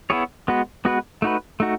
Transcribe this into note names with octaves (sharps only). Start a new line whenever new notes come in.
B3 E4 G#4 C#5
G#3 B3 F#4 B4
G#3 B3 F#4 B4
A3 D#4 F#4 B4
A3 D#4 F#4